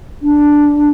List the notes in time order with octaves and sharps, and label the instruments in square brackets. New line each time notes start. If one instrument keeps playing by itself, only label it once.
[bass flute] D4